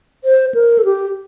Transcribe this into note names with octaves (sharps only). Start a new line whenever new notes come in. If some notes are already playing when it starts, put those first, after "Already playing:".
C5
A#4
A4
G4